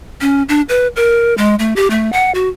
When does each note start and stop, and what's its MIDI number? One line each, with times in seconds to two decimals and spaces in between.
0.21 0.43 61
0.49 0.62 62
0.69 0.87 71
0.96 1.36 70
1.38 1.55 56
1.59 1.73 57
1.76 1.88 67
1.90 2.11 57
2.13 2.31 78
2.35 2.48 66